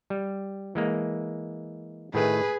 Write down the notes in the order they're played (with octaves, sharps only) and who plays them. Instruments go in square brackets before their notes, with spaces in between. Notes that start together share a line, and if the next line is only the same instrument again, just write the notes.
[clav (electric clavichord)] G3
E3 G#3 A#3
[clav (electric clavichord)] A2 D#3 A3 [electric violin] G#4 B4